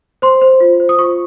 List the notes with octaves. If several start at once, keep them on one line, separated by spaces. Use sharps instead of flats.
C5 C6
C5
F4
C5
D#6
F4 C#6